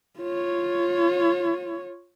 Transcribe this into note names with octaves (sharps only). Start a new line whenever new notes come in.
F4 C#5